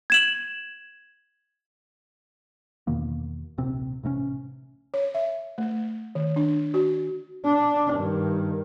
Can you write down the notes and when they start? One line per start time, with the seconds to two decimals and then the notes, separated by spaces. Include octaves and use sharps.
0.10 G#6 E7 F#7
2.87 E2 B2 D#3 A#3
3.58 D1 A#1 C3 C4
4.03 A1 C3 A3 C#4
4.94 C#5
5.15 E5
5.58 A3
6.15 D#3
6.36 D4
6.74 F#4
7.45 D4
7.93 G2 D#3